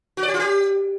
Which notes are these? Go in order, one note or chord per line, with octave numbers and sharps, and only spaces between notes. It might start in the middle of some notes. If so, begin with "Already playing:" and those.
F#4
D5
G4
F4
G4